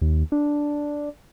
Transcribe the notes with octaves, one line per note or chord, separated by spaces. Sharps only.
D#2
D4